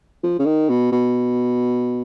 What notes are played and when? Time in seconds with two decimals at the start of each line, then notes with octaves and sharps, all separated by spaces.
0.23 F3
0.39 C#3
0.46 D#3
0.69 B2
0.92 B2